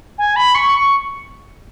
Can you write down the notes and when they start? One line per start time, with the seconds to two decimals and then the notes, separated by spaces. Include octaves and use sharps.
0.18 G#5
0.36 B5
0.55 C#6
0.73 C#6